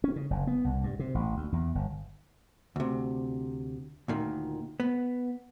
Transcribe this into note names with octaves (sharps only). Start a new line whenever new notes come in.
C#4
C#3
F#1
B3
C2
G2
C3
A1
D2
E2
G1
D2 C3
D2 A#2 D#3
B3